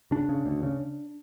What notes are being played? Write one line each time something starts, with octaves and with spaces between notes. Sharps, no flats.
C#3 D4
C#3
D2
C#3